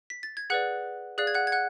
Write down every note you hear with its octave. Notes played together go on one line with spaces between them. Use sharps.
B6
A6
G#6
G#4 B4 D5 F#5 F#6
G#4 D5 F5 F#6
G#6
F#5 F#6
G#6
F#5 F#6